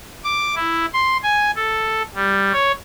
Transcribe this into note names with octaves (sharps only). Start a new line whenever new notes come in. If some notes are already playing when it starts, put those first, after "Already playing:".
D6
E4
C6
G#5
A4
G3
C#5